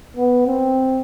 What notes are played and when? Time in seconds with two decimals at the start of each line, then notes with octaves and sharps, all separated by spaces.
0.16 B3
0.47 C4